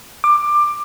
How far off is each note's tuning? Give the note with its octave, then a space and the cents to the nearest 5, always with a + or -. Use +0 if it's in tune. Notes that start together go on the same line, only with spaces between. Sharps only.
D6 +15